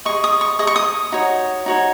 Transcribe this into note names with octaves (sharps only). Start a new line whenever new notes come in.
G#4 D#5 C#6
D#6
C#6
G#4 D#5 D#6
C#6
D#6
D#4 F#4 C#5
D#4 F#4 C#5